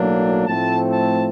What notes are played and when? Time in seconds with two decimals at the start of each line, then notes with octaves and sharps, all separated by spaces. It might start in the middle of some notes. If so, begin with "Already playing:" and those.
Already playing: B1 A2 F#3 A#3 D4
0.47 A2 F3 A3 C4 A5
0.93 A5